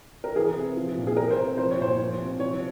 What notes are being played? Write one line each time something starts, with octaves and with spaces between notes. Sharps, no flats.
A#4
E3 G#4
C3
F3
A#2
G#4
E3 A#4
C5
C3
F3 C5
C#5
A#2 C5
F3
C3
F3 C#5